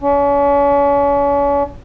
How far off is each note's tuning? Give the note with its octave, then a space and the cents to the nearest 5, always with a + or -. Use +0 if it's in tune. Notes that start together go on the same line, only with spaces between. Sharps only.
C#4 +40